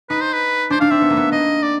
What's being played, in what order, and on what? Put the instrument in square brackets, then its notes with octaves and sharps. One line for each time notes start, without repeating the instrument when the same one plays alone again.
[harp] D#4 [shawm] B4
[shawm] C5
B4
[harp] D4 [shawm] C5
[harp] D4 [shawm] F5
[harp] C4 [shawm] E5
[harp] B3
A#3
B3
[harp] A#3 [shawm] D#5
[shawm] D5